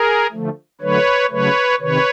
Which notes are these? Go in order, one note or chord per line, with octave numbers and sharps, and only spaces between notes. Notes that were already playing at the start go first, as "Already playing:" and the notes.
Already playing: G#4 A#4
D3 F3 A3
D3 F#3 A3 B4 C#5
C#3 F#3 A3 B4 C#5
C3 D#3 B4 C#5